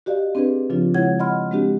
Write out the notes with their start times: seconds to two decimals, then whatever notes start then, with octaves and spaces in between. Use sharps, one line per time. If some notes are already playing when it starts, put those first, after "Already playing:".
0.06 F#4 G4 D5 D#5 F5
0.35 C4 D4 G4 G#4 B4
0.70 C#3 F3 C4 D4 F4
0.94 C#3 G#3 E4 C#5 F#5 G#6
1.19 D#5 F#5 B5 C6 F6
1.51 G#3 C4 D4 F#4 G4